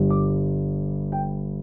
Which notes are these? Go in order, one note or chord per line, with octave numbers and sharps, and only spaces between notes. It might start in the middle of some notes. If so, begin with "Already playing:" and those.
Already playing: G1 G2 G3
D6
G5